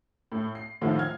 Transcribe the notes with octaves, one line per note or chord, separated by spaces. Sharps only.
A2
C7
A2 D3 D#3 F3 E4 F4
F6 G#6